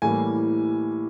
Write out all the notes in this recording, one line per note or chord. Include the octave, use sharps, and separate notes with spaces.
A2 E3 G3 A#3 G#5